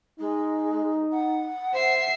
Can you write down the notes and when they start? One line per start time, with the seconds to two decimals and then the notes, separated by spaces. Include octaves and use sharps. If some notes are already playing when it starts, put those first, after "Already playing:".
0.19 G#3 D#4
1.12 F#5
1.74 C5 E5 C7